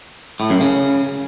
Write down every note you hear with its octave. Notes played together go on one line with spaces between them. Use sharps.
A2
F#2
C#3